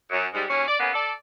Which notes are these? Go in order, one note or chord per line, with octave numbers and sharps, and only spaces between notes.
F#2
G#2 G3
D#2 F#3 C#4
D5
C#3 A#3 B3 C#4
A4 D5